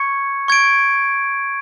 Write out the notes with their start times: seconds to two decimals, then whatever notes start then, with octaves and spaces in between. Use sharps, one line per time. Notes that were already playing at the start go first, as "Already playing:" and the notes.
Already playing: C#6 G#6 C#7
0.48 C#6 G#6 D7